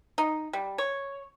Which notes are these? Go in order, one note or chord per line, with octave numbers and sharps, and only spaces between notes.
D#4
G3
C#5